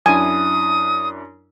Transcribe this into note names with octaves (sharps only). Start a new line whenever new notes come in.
F#2 D4 E4 G#5 D#6